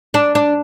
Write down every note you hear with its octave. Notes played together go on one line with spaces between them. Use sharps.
D4
D4